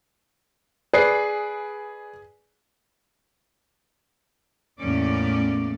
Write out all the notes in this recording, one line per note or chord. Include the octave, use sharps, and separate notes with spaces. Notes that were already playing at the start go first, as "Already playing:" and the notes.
G#4 B4 D5 C7
E2 A2 A#3 C#4 D5